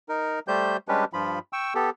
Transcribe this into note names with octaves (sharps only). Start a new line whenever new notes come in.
D#4 A#4
G3 A3 G4 C5 G6
G3 G#3 C#4 D4 G4 B4
G2 F3 F4 B5
G5 C#6 E6
B3 G4 A4